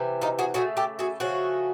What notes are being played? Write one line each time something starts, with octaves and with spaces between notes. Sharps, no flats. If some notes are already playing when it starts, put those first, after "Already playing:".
Already playing: C3 E3 G3
D#4 F4
F#4 G#4
C#3 E3 A3 F#4 G#4
G4 A4
F#4 G#4
C#3 F3 A3 F#4 G#4